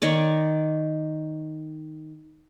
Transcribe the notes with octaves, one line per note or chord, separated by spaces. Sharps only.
D#3 C#5 D5